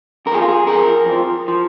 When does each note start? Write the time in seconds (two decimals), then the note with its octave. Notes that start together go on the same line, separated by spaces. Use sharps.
0.26 F2 A#4
0.32 F3 G#4
0.41 F4
0.49 G#4
0.67 F2 F3 A#4
1.06 F2
1.12 F3
1.48 F3